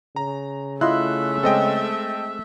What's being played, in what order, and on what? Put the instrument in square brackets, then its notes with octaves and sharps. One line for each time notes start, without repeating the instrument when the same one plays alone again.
[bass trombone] C#3 [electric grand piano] A#5
[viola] A3 E5 [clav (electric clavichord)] E4 F4 D#5 [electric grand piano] C6 F#6
[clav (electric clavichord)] G#3 C4 [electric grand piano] A4 D#5 G5